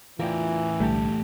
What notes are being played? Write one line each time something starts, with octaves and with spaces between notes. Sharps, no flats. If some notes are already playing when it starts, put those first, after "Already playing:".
E2 A2 E3 F4 A#4 D5 G5
B1 D3 G3 A3 G4 A5